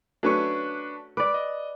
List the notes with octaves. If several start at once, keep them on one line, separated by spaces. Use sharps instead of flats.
F#3 A3 C#4 D4 B4 C#6
B4 D5 D6
D#5